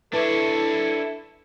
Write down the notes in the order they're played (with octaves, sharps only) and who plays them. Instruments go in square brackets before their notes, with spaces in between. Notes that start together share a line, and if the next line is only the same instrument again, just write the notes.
[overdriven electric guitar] D4 C#5 [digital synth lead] E4 [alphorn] A4 [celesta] B4 A5 D6